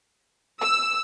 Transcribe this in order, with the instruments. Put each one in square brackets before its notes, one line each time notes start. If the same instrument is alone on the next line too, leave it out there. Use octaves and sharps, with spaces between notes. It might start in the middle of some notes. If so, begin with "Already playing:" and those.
[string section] E6